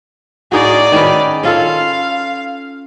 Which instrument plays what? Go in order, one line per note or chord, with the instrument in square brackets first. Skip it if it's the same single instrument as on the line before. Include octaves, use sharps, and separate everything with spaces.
[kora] A2 D#4 F#4 [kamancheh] G#4 D5
[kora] D#3 C#4 B4
[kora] C#4 F4 A4 [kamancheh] F5